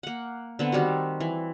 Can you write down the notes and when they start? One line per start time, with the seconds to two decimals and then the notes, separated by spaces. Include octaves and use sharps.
0.03 A#3 F#5
0.59 D3 B3 C4
0.72 D#3 G3 C4 F#4
1.20 E3